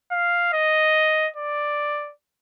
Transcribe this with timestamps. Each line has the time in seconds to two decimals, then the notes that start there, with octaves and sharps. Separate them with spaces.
0.12 F5
0.53 D#5
1.36 D5